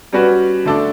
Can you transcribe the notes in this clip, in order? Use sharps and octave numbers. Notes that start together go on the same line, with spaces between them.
G3 C#4 F#4 B4
D3 A3 D4 A4 D5